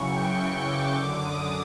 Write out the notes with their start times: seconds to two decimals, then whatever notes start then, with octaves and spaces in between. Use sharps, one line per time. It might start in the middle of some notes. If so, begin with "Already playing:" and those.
Already playing: F#2 C#3 E3 C#6
0.08 G5
0.38 C#6
0.65 D6
0.95 F#2 D3
1.23 D#6